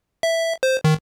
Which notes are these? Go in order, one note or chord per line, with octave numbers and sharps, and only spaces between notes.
E5
C5
D#3